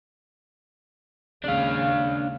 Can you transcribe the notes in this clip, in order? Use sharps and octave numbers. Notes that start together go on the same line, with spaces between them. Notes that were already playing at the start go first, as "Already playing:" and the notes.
D#2 C#3 G#3 D4 F5